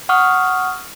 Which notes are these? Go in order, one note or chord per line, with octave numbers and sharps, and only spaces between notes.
F#5 C#6 D#6 F6